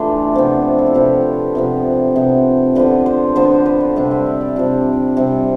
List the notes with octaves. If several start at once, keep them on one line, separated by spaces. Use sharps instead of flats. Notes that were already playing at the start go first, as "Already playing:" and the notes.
Already playing: E3 A3 D4 F4 G4
C3 F3 B3
E4
F4
C3 F3 B3 G4
C3 F3 B3
C3 F3 B3
D3 F3 B3 B4
C5
D3 F3 B3 C5
C5
B4
D5
C3 G3 D4 E5
E5
B5
D5
C3 G3 D4 F4
C3 G3 C4